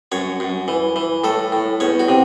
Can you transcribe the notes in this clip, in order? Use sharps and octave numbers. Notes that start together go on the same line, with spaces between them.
F#2 C#5
F#2
E3
E3
A2 A4
A2
E2 C#5
F#4
C3